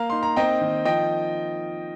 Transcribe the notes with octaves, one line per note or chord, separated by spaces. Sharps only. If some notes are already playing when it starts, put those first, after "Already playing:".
Already playing: A#3 F5 A#5
D#4 C6
A#5
C4 D#5 G5
D#3
F3 D#5 G5